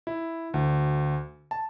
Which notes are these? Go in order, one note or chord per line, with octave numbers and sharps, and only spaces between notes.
E4
D2
A5